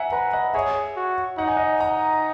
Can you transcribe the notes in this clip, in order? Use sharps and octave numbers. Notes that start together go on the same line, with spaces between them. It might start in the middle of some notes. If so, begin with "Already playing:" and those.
Already playing: E5 F#5 G#5 A#5
B4 F#5 A#5
D#5 F#5
G#4 C#5 E5
F#4
D#4 F#5
G#5
D#5 F#5
F#5 A#5